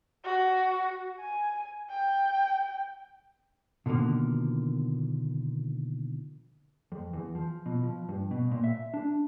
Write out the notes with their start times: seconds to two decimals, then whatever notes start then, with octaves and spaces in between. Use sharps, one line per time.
0.24 F#4
1.20 G#5
1.90 G5
3.86 B2 D3 D#3 F3 A#3
6.92 F2
7.13 E2
7.35 F3
7.66 B2
7.83 F3
8.09 G2
8.31 B2
8.51 A#2
8.64 E5
8.94 D4